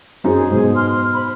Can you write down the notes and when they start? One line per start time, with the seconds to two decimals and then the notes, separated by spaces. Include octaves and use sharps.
0.24 F#2 D#4 G#4 C5
0.50 G#2 B2
0.74 C6 F6
1.15 C5 B5